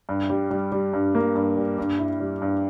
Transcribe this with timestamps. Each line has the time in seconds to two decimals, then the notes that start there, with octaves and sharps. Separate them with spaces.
0.09 G2
0.30 G3
0.51 G3
0.72 G3
0.93 G2
1.15 A#3
1.35 G2
1.57 G3
1.78 G2
1.99 E4
2.20 G3
2.42 G2